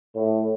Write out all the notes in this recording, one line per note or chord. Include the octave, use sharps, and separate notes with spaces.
A2